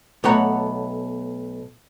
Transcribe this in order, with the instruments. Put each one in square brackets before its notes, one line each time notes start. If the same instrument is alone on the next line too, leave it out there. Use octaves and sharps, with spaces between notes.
[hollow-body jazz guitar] B1 A3 B3 C#5 F#5 A#5